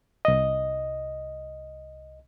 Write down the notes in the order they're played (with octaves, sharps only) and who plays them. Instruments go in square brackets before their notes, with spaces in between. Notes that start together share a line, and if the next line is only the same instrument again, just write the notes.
[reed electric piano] C2 D#5